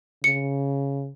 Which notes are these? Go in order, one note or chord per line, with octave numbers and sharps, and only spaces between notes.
C#3 C#7